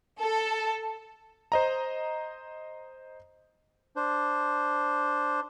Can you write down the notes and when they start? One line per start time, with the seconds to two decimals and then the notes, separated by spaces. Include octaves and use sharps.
0.18 A4
1.52 C5 D#5 A#5
3.96 D4 C5